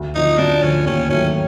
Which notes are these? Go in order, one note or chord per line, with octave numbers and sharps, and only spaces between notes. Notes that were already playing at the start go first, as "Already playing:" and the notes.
Already playing: D2
D3 F3 D#4
D2 D4
D3 F3 C#4
D#2 C#4
D#3 F#3 A3 C#4